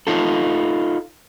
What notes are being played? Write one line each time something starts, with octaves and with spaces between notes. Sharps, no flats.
D#4 F4 A4